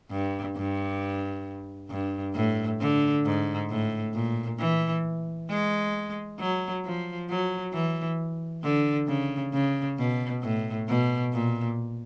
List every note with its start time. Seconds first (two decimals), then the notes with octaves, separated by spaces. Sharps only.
0.11 G2
0.56 G2
1.90 G2
2.35 A2
2.80 D3
3.26 G#2
3.70 A2
4.14 A#2
4.59 E3
5.49 G#3
6.39 F#3
6.85 F3
7.29 F#3
7.73 E3
8.63 D3
9.08 C#3
9.53 C#3
9.98 B2
10.42 A2
10.88 B2
11.33 A#2